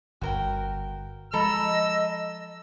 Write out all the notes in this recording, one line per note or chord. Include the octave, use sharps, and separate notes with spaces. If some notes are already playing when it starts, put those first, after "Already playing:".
G1 F#4 A#4 G5
F3 G#3 A4 D#5 A#5 B5 E6